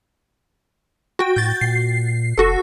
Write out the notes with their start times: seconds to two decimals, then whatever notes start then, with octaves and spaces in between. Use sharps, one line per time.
1.19 F#4 G5
1.36 A2 G6 A6
1.61 A#2 C7
2.38 F1 F#4 A4